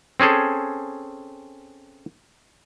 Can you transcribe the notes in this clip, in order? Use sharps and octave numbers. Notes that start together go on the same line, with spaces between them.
C4 C#4 G#4 A4